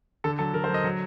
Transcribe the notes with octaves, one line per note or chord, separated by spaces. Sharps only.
D3 A4
F#3 A4
D3 A#4
C5
F#3 D#5
F#3